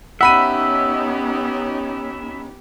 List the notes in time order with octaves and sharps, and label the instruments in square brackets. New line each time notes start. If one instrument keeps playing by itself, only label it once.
[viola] B3 G4 [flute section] C#4 D#4 [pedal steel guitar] E5 [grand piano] F#5 B5 D#7